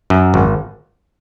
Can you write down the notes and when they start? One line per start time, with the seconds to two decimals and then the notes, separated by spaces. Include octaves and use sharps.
0.10 F#2
0.34 G#1